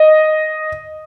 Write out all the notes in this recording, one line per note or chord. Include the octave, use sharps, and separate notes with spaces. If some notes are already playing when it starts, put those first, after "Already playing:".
Already playing: D#5